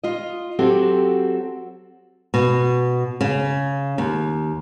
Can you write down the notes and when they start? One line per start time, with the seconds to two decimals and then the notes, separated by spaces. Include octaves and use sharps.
0.03 F4 D#5
0.59 F#3 C4 F#4 G4 A4
2.34 B2
3.21 C#3
3.98 D#2